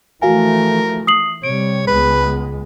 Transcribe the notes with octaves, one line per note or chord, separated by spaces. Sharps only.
E3 F3 A3 F#4 A#4 F5 G#5
D#6 C7 F#7
C3 G3 C#5 D7
C#2 G#3 B3 B4